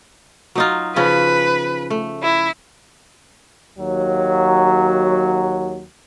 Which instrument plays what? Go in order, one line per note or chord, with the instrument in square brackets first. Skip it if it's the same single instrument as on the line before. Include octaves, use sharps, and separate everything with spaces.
[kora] F#3 D#4 F4
[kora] C#3 F3 C#4 [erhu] B4
[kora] A3
[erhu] E4
[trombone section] D#2 F#3